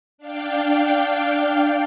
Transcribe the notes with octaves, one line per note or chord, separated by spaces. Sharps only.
D4 F5 G5